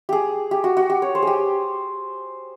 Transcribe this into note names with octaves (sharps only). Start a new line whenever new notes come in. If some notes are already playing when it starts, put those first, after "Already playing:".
G4 G#4
G4
F#4
F#4
G4
C#5
C5
G4 G#4